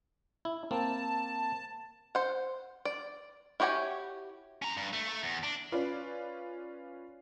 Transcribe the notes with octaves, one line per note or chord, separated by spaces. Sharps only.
E4
A#3 C4 A5
C5 F#5
D5
E4 F#4 G4 C#5 G#5
C#4 A#5
G2
A3
A3
E2
D4
C#4 F4 B4 D5